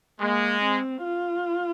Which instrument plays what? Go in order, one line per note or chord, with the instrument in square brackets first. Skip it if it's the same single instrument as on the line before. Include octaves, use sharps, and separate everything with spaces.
[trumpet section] G#3 [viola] A#3
[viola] C4
F4